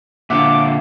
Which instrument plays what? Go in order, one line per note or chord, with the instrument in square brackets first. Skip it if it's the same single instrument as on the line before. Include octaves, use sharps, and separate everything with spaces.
[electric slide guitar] A#2 D3 F4 [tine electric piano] E5 F#5 [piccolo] D6